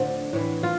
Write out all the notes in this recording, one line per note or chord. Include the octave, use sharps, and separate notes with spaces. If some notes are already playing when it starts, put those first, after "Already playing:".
Already playing: A2 D3 F3 C4 D4
A2 E3
F4